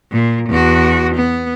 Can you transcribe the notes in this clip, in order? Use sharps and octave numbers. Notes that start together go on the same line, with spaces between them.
A#2
E2 F#4
B3